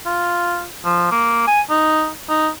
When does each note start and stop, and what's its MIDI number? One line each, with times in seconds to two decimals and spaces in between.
0.06 0.66 65
0.85 1.10 53
1.12 1.42 58
1.47 1.61 80
1.70 2.10 63
2.29 2.50 63